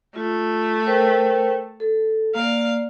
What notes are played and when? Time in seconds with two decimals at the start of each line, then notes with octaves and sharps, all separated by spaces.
0.16 A3 F4
0.86 A#4 C5 G5
1.80 A4
2.35 A#3 D5 F5